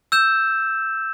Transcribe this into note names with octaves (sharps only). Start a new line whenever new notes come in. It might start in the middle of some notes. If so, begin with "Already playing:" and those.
E6 G6 E7